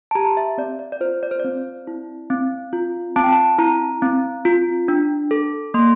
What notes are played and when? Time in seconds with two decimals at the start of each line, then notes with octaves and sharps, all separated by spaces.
0.11 A5
0.15 G4 A#5
0.37 E5
0.58 C4 D5
0.79 D5
0.92 D5
1.01 F4 C5
1.23 D5
1.31 C5
1.40 C4 D5
1.87 E4
2.30 C4
2.73 F4
3.16 C4 A5
3.24 G5
3.33 A5
3.58 E4 A#5
4.02 C4
4.45 F4
4.88 D4
5.31 A4
5.74 A#3 C6